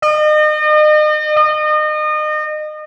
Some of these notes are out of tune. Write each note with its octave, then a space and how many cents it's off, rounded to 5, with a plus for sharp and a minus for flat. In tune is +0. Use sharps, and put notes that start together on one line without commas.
D#5 -35
D#5 -30